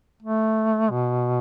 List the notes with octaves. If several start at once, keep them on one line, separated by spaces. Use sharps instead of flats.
A3
B2